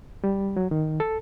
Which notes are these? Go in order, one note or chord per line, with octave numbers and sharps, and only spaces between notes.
G3
F#3
D#3
A4